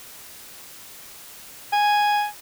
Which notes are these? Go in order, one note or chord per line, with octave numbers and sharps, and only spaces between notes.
G#5